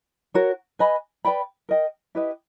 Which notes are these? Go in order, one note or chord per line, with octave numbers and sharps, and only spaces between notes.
F#4 A#4 C#5
B4 D#5 G#5 B5
B4 D5 G5 B5
A#4 D#5 G5
E4 G4 B4 D#5